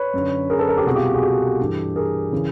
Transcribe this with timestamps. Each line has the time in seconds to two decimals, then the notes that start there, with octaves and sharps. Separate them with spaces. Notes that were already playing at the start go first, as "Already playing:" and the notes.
Already playing: B4 C#5
0.14 F#2 D3
0.50 G#4 A#4
0.59 A4 B4
0.68 G#4 A#4
0.77 G4 A4
0.86 C2 B2 F#4 G#4
0.96 F4 G4
1.14 F#4 G#4
1.23 G4 A4
1.60 G2 E3
1.96 G#4 A#4
2.32 C#3 E3